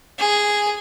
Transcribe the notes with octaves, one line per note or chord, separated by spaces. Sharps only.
G#4